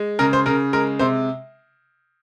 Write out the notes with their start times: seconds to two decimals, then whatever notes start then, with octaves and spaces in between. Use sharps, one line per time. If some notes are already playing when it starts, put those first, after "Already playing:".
Already playing: G#3
0.19 C#3 A#4
0.33 C5
0.46 C#3 A#4
0.73 G#3 A#4
0.99 C3 C5